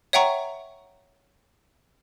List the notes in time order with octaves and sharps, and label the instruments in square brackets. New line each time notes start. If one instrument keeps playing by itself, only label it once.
[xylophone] C#5 E5 F#5 G5 A#5 C#6